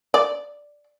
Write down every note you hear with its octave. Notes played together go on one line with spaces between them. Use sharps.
D5